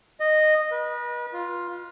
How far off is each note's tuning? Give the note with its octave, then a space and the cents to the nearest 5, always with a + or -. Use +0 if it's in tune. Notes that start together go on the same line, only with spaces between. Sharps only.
D#5 -10
B4 -35
F4 +5